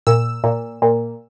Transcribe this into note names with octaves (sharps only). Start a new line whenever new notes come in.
A#2 E6
A#2
A#2